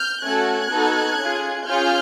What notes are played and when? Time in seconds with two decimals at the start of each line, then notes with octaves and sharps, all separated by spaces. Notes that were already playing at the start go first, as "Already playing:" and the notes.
Already playing: F6 G6
0.23 A3 C#4 F#4 A4 F#6 G#6
0.71 B3 D#4 F#4 A4
1.18 C#4 F4 G#4
1.66 C#4 F4 G#4 F6 G6